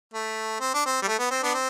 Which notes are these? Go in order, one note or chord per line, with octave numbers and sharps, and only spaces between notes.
A3
C4
D4
C4
G3
A3
B3
C4
B3 D4
C4